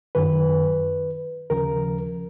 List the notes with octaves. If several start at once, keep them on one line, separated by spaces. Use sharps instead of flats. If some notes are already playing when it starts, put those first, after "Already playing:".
F#2 D#3 F#3 B4
D#2 C#3 F3 A#4